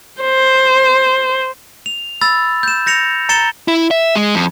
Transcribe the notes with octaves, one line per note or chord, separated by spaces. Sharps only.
C5
F7
B5 E6 A6
G6 E7
G6 A#6 C#7 F7
A#5 A6 C#7 E7 G7
E4
E5
G#3
F2